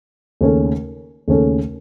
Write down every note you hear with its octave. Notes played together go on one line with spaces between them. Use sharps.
D#2 C#3 A3 C#4 A4
D#2 C#3 A3 C#4 A4